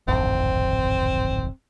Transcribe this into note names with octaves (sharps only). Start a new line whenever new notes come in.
D1 G#1 F2 C4